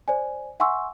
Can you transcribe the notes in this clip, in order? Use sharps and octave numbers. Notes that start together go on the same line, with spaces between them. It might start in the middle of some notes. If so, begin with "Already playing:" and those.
C5 D5 G#5
E5 F#5 G#5 C6 C#6 E6